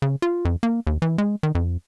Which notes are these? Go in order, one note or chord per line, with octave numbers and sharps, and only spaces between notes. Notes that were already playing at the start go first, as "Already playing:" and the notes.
C#3
F4
F2
A#3
D#2
E3
G#3
D#3
F2